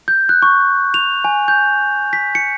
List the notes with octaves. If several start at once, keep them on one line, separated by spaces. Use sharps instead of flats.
G6
F#6
C#6
F7
G#5
G6
B6
C#7